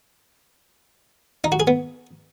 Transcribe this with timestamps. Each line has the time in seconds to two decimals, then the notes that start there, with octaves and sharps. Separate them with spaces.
1.44 D#4
1.52 F#4
1.60 G#4
1.67 B3